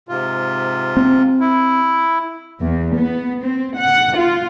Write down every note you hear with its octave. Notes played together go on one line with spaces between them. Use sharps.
G#2 C3 F4
C4
E4
E2
B3
C4
F#5
F4